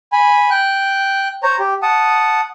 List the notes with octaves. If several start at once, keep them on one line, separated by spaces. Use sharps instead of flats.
G#5 B5
G5 F#6
C5 C#5 A#5
G4
F#5 A5 D#6